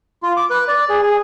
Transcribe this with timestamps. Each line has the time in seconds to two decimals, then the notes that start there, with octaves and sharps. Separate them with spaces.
0.23 F4
0.37 D6
0.50 B4
0.68 D5
0.89 G#4
1.03 G#4